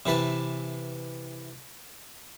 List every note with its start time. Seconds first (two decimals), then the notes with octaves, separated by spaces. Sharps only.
0.06 C3 E3 B4 A5